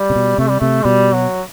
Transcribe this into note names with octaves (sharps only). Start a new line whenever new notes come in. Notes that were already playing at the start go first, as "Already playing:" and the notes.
Already playing: G3
C3
B2
C3 A3
G3
C3 A3
B2 G3
F#3